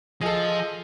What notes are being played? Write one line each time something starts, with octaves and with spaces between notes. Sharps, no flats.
F3 G#4 A4 D#5 G#5